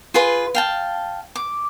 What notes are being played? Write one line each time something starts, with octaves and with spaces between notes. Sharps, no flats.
F4 G#4 B4 C6
F5 G5 A5
D6